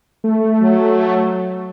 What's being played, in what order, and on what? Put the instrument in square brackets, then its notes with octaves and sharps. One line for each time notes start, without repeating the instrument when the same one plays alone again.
[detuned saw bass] A3
[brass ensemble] F#3